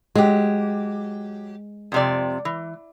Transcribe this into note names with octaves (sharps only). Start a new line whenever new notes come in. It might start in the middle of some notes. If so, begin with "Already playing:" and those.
F#3 G#3 G4
F2 C3 D5
E3